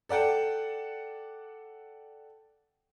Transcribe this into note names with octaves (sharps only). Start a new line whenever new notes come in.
A4 D5 F#5 G5 A5